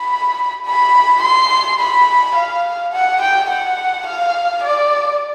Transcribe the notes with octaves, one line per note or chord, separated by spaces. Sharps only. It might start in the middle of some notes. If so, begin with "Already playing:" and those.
Already playing: B5
B5
C6
B5
F5
F#5
G5
F#5
F5
D5